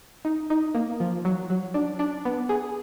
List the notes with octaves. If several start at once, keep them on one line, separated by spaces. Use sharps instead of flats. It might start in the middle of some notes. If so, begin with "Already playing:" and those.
D#4
D#4
A#3
F3
F#3
F#3
D4
D4
B3
G#4